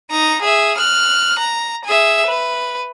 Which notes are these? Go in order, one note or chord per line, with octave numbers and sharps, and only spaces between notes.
D#4 A#5
G#4 E5
F6 F#6
A#5
G#4 E5
B4